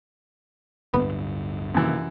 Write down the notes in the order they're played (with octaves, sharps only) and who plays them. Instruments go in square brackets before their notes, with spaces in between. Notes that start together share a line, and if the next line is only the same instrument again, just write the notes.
[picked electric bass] D1 G2 D3 [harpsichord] B3
[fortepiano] F#2 E3 [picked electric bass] C3 D#3 A#3